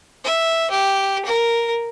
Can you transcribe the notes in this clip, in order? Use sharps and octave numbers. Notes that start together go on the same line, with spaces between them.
E5
G4
A#4